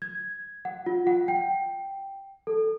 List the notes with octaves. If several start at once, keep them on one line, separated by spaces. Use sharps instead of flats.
G#6
F#5
F4
F#5
G5
A4